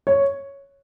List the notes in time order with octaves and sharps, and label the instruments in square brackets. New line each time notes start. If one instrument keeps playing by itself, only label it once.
[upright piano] C#5